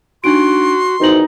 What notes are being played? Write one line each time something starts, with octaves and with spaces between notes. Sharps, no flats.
D4 D#4 F#4 C6 D7
E2 D#3 D#4 F#4 C5 F#7